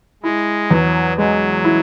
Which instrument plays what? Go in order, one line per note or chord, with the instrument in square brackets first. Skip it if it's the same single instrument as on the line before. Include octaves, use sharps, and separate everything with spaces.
[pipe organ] G#3 [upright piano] E4
[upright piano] E2 [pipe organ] F#3
[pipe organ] F#3 [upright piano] G#3
[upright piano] E4